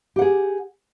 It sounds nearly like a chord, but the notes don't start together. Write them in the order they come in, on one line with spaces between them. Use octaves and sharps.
G4 F#5 G#4